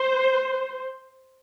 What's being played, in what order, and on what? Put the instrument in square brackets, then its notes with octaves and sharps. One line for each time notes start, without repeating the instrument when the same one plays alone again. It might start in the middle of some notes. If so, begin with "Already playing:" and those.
Already playing: [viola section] C5